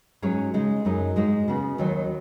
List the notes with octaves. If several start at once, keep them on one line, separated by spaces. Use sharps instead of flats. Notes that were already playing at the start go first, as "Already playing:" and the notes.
G#2 F#3 C#4 G#4 C#5
C#3 G#3 D#4
F#2 F#3 D#4 G#4
G#2 G#3 D#4 F#4
C#3 B3 F#4
D#2 D#3 F#3 D#4